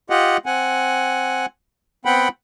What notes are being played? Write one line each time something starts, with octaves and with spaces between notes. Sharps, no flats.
F4 G4 D#5 F#5
C4 F#5 G#5
B3 C4 F#5 G5 B5